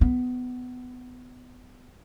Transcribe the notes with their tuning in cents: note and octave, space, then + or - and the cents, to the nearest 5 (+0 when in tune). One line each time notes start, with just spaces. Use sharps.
B3 +20